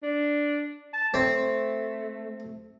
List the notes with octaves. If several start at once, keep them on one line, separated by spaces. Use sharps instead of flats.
D4
A5
A3 C4